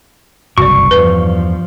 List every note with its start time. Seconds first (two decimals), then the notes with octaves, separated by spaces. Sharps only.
0.58 F#1 C2 G2 F#4 D5 C#6
0.91 E2 G2 F3 B4